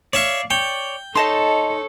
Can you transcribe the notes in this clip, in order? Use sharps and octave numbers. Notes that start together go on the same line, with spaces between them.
C#5 D5 E5 F5 C#6
C#5 D5 G5
D#4 A4 C#5 D#5 A5 C6